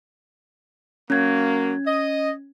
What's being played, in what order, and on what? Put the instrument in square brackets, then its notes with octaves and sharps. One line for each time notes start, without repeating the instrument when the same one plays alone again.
[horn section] F#3 A#3 [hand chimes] C#4 G#6
[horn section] D#5